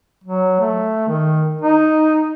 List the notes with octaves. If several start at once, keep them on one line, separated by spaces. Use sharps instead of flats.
F#3
A3
D#3
D#4